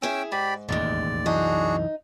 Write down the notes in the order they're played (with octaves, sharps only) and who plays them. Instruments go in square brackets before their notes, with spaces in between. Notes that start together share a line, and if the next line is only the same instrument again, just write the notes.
[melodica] C#4 G5 E6 [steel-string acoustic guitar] E4 G#4 G#5
[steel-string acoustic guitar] G#2 [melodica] G4 D5 B5
[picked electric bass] E1 A1 D#2 [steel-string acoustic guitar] D#3 G#3 [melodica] D5
[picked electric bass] C2 F#2 E3 [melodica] D4 F#4 G#4 [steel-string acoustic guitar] D#4